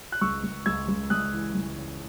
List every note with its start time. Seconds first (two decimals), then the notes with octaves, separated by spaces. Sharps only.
0.12 F#6
0.21 C#2 C#6 E6
0.44 C#2
0.66 C#2 E6 G#6
0.88 C#2
1.10 C#2 D#6 F#6
1.33 E3
1.55 C#2
1.77 C#3